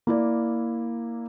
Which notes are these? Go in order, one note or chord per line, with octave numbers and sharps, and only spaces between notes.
A#3 E4 D5